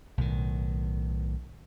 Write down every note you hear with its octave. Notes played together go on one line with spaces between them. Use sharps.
B1 A2 D#3